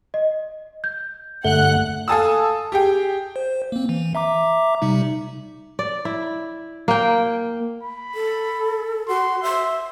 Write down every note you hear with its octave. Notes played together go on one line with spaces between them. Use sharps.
D#5
G6
G2 D3 A3 F#5 F#6 G7
A4 F5 G#5 A5 D#6 E6
G4 G#4 G5
C5
A#3 C4
E3
E5 A#5 D6
C3 G3 D#4
D5
E4
A#3 G5
B5
A4
F#4 C6
E5 C6